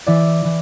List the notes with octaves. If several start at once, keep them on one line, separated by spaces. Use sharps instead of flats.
E3 D5 E5
E3